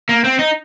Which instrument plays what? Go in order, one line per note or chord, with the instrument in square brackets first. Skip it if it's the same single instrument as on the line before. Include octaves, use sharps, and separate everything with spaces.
[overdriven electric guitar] A#3
C4
D#4